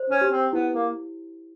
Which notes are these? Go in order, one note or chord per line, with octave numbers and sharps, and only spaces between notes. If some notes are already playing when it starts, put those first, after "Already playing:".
Already playing: C5
C#4
G4
C4
B3 E4
A#3